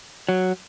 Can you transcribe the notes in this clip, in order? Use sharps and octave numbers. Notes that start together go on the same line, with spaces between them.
F#3